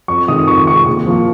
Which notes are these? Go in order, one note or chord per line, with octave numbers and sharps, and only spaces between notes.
F2 C#6
C3 D#3 G#3 D#6
F2 C#6
C3 D#3 G#3 C#6
A#2
F3 A#3